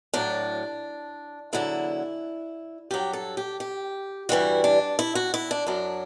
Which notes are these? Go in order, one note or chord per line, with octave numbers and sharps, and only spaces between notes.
A2 F#3 D4
E2 D3 F#3 E4
G2 F#3 G4
A4
G4
G4
G2 E3 G3 F#4
D4
E4
F#4
E4
D4
F#2 F#3 D4